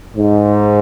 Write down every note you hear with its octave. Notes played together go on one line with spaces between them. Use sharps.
G#2